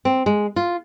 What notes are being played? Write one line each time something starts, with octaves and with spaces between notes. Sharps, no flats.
C4
G#3
F4